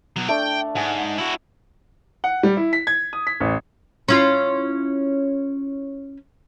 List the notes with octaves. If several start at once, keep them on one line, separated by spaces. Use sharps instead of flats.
B2 F#3
A3 D4 G5
G#2 F#5 G#5
E4 F#4
F#5
G3
E4
B6
G#6
D#6
B6
A1
C#4 E4 F4